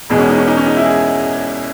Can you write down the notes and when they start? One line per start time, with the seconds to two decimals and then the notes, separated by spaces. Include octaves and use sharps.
0.10 E1 E2 B2 G#3
0.19 C#4
0.29 D#4
0.38 C#4
0.48 D#4
0.57 C#4
0.67 D#4
0.77 E4
0.85 G#4